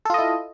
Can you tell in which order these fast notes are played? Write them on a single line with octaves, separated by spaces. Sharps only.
A4 F4 D#5 E4